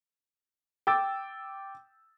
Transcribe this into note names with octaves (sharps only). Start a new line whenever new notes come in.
G5 D6 E6 A6